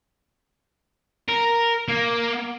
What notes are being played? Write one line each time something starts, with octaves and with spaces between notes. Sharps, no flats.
A#4
A#3